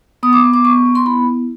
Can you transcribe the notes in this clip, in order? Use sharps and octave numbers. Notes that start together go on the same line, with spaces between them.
B3 D#6
D6
B3
D6
B3 C#6
B3
C6
E4 B5
B3